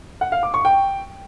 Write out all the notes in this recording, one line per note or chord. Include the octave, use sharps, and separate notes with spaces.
F#5
F5
D6
C#6
G5